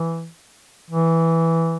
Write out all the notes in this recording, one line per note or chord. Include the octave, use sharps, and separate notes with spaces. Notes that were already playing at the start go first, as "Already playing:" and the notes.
Already playing: E3
E3